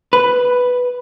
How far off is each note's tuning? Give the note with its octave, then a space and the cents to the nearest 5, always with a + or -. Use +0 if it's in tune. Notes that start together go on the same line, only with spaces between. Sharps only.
B4 +0